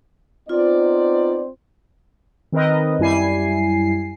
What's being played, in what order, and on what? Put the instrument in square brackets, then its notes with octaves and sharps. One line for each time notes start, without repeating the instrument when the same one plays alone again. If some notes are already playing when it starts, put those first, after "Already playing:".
[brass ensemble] B3 D#4 D5 [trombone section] C4 C5 [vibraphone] F4
[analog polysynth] D#3 C4 A#4 B4 D#5
F#2 G3 E4 G#5 C7